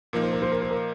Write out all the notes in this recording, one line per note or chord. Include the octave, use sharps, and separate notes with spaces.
A#2 F3 A#3 D#4 A#4
C5
A#4
C5
A#4
C5
A#4